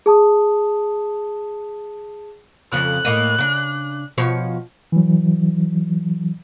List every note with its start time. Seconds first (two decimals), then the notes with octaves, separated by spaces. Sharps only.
0.06 G#4 A5 D#6
2.72 F2 C#3 F#6
3.05 A2 A#3 D#5
3.38 C#3 D4
4.18 B2 F3 C#5
4.92 E3 F#3